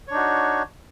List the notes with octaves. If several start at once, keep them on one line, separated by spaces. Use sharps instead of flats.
D4 D#4 F#4 C#5